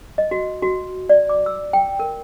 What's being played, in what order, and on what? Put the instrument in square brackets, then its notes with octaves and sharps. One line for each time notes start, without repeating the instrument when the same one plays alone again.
[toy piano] D#5
F#4
F#4
D5
D6
E6
G5
A#4